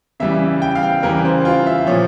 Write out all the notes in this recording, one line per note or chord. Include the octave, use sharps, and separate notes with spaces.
C#3 E3 G3 E5
G5
F5
G5
C#3 E3 G3 A#4
C5
F4
E5
A#2 F3 C#5